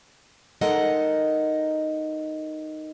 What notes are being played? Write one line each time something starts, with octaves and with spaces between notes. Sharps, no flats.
G#3 D#4 A4 A#4 D#5 F#5